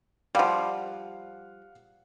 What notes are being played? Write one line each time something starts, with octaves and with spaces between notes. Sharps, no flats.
F3 G3 F5 F#5